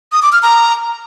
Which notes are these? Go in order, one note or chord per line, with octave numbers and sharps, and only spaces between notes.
D#6
D6
F6
A#5